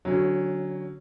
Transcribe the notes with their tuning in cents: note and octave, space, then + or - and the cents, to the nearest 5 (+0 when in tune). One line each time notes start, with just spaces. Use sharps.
D3 +0 F#3 +5 C#4 -20